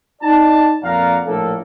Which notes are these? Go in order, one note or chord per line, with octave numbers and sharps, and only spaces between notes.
D#4 D5 A5
F2 A#2 D5 F5 F#5 A#5
A#1 A2 A#3 A4